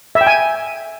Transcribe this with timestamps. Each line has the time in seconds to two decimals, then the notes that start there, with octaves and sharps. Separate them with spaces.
0.15 E5
0.21 G5
0.27 G#5